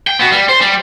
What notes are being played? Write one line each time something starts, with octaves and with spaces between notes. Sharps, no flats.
G5
B3 F#4
G3
C5
G3